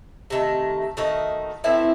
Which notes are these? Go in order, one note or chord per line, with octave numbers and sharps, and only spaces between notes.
C3 D#3 A3
D#3 A3 D#4 F#4
A2 E3 C4 E4